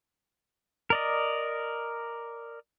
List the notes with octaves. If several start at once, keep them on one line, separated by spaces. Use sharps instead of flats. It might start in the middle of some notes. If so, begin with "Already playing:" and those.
A#4 D5 D#5